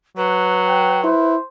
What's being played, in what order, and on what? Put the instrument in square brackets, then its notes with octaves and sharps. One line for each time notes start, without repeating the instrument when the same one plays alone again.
[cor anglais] F#3 [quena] B4
[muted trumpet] G5
[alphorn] E4 [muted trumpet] C5